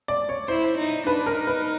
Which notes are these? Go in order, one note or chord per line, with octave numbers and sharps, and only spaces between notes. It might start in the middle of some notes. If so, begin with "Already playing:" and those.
D5
C#5
E4 C5
D#4
D4 B4
A#4
D#4
B4